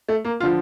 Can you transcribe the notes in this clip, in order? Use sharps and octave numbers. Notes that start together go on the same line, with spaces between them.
A3
A#3
D3 F3 F4